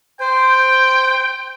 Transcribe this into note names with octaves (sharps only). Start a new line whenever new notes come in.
C5 G5